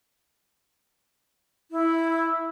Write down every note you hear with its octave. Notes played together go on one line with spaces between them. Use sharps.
E4